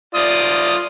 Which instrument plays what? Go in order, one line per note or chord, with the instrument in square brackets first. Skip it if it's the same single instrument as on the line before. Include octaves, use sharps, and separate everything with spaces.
[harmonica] F4 D5 D#6